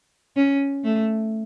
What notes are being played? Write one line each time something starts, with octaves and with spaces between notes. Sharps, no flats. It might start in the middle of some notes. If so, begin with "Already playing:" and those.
C#4
A3